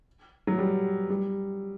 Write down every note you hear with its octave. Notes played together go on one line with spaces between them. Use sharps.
F#3
G3
G3